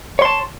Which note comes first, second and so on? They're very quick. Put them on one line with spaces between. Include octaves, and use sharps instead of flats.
C#5 C6 A5